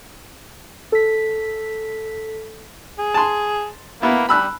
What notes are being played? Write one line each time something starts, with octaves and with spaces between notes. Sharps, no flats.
A4 B6
G#4
A5 C6
A#3 B3 E4
G3 B5 E6 F#6